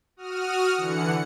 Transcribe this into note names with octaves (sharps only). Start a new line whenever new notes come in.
F#4 D#6 F6
D3 E3 F#5 C#7